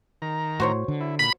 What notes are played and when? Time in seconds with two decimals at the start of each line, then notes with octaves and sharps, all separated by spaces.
0.22 D#3 A#5
0.60 A2 F#4 C5 C#5
0.88 D3
1.01 E4
1.19 A#2 B5